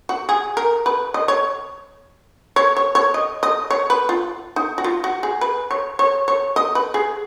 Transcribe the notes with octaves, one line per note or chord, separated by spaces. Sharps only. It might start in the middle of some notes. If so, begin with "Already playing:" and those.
F#4
G#4
A#4
B4
D#5
C#5
C#5
C#5
C#5
D#5
D#5
C#5
B4
F4
D#4
F#4
F4
F#4
G#4
B4
C#5
C#5
C#5
D#5
B4
G#4